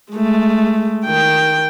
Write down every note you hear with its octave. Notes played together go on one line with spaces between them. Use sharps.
G#3 A3
D#3 G5